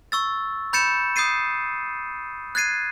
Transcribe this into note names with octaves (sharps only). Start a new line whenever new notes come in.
C#6 E6 A6
B5 G6 A6 C#7 E7
D#6 G6 A6 C7 D#7
F#6 G#6 A6 C7 D#7